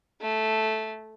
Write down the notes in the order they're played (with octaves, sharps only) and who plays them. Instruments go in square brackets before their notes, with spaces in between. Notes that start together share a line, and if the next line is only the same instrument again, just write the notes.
[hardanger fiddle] A3